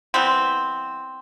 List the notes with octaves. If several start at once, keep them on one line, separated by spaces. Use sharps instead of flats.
E3 G3 B3 C4